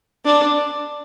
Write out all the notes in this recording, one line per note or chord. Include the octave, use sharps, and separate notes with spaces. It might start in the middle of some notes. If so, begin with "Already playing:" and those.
D4